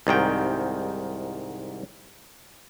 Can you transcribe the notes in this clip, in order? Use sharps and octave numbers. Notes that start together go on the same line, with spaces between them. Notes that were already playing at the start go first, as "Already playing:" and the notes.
C2 G#2 D#3 G5